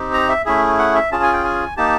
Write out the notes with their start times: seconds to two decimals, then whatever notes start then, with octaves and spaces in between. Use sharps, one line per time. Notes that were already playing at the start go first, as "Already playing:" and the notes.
Already playing: C4 D#4 G4
0.13 A#5
0.29 E5
0.45 A3 C#4 E4 G#4 E5
0.79 F#5
0.95 E5
1.12 C#4 F4 G#4 A5
1.23 G#5
1.33 G5
1.44 G#5
1.77 A#3 D#4 G4 A5